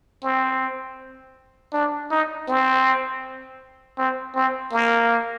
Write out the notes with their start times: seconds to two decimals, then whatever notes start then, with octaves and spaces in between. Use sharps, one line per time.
0.23 C4
1.73 D4
2.11 D#4
2.48 C4
3.98 C4
4.36 C4
4.73 A#3